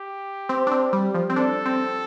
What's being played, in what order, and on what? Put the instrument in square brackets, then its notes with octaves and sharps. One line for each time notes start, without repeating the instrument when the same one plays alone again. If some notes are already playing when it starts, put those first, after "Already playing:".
Already playing: [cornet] G4
[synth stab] C4
D4
C4
G3
F3
C4
[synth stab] D4 [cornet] A4
[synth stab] C4